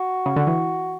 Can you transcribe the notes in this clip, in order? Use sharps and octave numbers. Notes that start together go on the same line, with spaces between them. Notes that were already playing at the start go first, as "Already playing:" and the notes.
Already playing: F#4
C#3
D3
E3